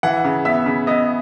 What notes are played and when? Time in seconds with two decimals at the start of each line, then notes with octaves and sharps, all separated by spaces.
0.03 E3 F#5
0.25 C#3
0.45 B3 E5
0.66 C#3
0.87 B3 D#5